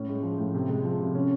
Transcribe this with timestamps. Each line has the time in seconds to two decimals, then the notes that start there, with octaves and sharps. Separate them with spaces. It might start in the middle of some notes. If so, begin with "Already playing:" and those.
Already playing: A2 C#4
0.08 G#3
0.23 F3
0.38 A2
0.54 C3
0.69 G#3
0.84 F3
1.00 C3
1.15 C#4